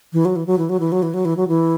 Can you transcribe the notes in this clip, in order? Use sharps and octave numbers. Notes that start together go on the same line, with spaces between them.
E3
F#3
E3
F#3
E3
F#3
E3
F#3
E3
F#3
E3
F#3
E3